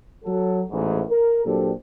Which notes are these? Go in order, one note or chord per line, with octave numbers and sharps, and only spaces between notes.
F#3 A4
A1 E2 G#2
A#4
A#2 F#3 C4 D4 G4 A4